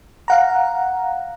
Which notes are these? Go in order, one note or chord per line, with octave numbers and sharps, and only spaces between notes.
F5 F#5 A#5